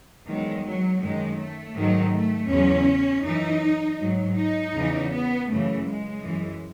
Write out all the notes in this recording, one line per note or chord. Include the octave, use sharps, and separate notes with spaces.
E2 D#3 F#3 G#3
F#3
F#2 D#3 F#3 G#3
A3
G#2 D#3 F#3
A3
E2 C#3 F#3 C#4
F#2 E3 D#4
G#2 F#3
D#4
E2 C#3 E3
B3
F#2 C#3 E3 A3
G#3
F#2 E3